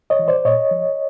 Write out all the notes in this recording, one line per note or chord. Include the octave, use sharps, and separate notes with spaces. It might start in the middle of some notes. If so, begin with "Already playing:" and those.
C#5 D#5
E3
C5 D5
A#2 C#5 D#5
F3